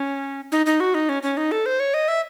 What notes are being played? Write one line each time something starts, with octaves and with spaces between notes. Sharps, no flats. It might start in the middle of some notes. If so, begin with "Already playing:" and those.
Already playing: C#4
D#4
D#4
F#4
D#4
C#4
C#4
D#4
A4
C5
C#5
D#5
E5